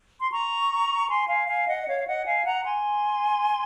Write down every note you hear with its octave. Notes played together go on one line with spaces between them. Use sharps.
C6
A#5 C#6
G#5 C6
F5 G#5
F5 G#5
D#5 F#5
D#5
C#5 F5
F5
D#5 F#5
F5 G#5
F#5 A#5
G#5 C6